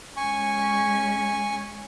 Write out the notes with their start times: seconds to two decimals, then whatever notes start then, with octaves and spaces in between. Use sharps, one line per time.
0.17 G#3 C#4 G#5 C#6